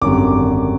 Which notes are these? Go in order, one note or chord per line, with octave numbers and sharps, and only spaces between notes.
G#1 F#2 D3 G3 D6